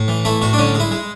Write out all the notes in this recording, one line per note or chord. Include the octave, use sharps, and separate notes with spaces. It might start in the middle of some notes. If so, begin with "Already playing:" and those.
Already playing: A2
E3
A3 E4
A2 F#4
D4
D3 C#4
G#3
E4
G#3